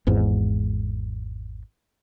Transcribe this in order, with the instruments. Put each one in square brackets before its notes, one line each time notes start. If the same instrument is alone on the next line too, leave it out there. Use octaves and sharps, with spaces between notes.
[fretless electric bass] G#1 E2 G#2